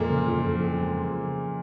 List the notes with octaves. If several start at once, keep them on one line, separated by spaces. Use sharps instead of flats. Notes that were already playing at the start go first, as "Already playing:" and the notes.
Already playing: F2 A#2 G#3 A#3
C#3
F2
F2
F2
G#3